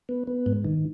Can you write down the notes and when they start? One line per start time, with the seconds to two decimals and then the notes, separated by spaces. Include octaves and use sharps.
0.09 B3
0.27 B3
0.46 G#2
0.64 D#3